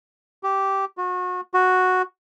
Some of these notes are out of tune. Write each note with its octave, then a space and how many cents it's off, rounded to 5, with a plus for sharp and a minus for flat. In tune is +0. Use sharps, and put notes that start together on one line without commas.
G4 -10
F#4 -35
F#4 -5